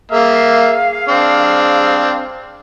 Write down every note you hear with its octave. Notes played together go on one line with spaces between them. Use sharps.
A#3 G#4 E5 F5
C4 D4